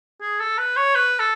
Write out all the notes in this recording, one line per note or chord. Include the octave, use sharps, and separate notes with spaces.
G#4
A4
B4
C#5
B4
A4